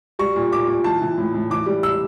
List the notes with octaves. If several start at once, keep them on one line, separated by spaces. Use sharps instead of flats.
G3 C#6
A#2
A#2 D6
A#2
E3 A5
E3
A2
A2
E3 D6
G3
E6